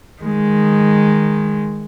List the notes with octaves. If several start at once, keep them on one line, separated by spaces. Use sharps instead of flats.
D#3 G#3